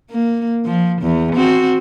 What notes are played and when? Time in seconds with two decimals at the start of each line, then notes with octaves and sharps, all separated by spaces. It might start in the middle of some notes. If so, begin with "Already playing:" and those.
0.11 A#3
0.65 F3
1.02 E2
1.35 C4 F#4